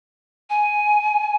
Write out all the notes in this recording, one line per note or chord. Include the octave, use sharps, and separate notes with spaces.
G#5